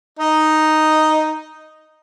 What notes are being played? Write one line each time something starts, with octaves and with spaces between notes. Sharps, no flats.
D#4 D#5